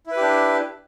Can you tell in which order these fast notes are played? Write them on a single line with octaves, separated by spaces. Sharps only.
E4 B4 G4 D4